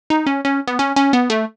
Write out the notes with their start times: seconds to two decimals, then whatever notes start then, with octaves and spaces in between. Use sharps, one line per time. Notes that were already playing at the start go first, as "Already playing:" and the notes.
0.10 D#4
0.26 C#4
0.45 C#4
0.67 B3
0.79 C#4
0.96 C#4
1.13 B3
1.30 A3